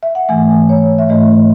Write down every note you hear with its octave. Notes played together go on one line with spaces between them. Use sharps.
E5
F#5
G#2 E3 A3 G#5
C#5
E5
G#2 E3 A3 D#5